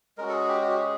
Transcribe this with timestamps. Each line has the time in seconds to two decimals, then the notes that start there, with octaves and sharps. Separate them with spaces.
0.18 G#3 C#4 F#4 A#4
0.29 A4
0.33 G#4
0.48 G4
0.62 F#4
0.70 G4
0.77 G#4